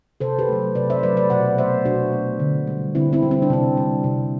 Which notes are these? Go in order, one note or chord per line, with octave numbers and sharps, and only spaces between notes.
C3 A4 C5
G4 B4
F#3 A3
C3 B4 D5
C5 E5
F#3 A3 B4 D5
B4 D5
B2 D5 F#5
A3 C5 E5
B2 D4 F#4
A3
D3
G3
D3 C4 E4
C4 E4
G3
C4
D4
C3 C4
G3
C3